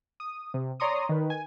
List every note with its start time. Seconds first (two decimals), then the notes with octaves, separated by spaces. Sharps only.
0.20 D#6
0.54 C3
0.80 C#5 D5 A#5 C6 C#6 D#6
1.09 D#3 B4
1.30 G#5